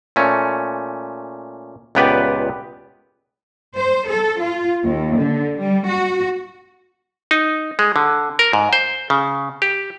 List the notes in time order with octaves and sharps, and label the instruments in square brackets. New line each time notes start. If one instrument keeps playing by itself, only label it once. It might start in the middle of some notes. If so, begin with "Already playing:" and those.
[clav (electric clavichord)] A#2 A3 C#4
C#2 A#2 B3 G4 B4 D5
[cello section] C5
A4
F4
D#2
D3
G3
F#4
[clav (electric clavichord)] D#4
G#3
D3
A#4
G#2
C5
C#3
G4